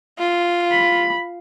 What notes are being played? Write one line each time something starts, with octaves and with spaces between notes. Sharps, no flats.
F4
B5